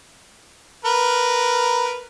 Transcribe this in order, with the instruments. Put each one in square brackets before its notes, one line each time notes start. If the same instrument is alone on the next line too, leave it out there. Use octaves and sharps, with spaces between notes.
[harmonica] A#4 B4